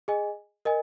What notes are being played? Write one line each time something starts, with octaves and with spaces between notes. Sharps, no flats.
G#4 D#5 G#5
A#4 D#5 G#5